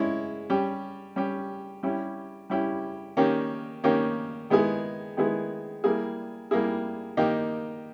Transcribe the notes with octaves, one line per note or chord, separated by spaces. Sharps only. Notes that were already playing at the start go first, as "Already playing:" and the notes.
Already playing: G#3 C#4 E4
G3 C#4 G4
G3 C#4 G4
G3 C#4 E4 G4
G3 C#4 E4 G4
D#3 A#3 C#4 G4
D#3 A#3 C#4 G4
D#3 G#3 B3 E4 G#4
D#3 G#3 B3 E4 G#4
G3 A#3 E4 G#4
G3 A#3 E4 G#4
D#3 A#3 D#4 G4